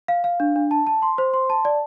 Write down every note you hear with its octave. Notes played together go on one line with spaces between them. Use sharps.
F5
F5
D4
D4
A5
A5
C6
C5
C6
A5
D5